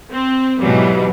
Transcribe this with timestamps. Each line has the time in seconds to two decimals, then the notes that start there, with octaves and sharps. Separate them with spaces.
0.11 C4
0.61 G#2 B2 E3 F#3 G3